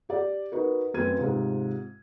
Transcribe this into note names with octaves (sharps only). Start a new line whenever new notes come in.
G4 D5
D#4 F#4 A#4 B4
F#2 A3 C4 B4 G#6 D#7
G#2 C3 F4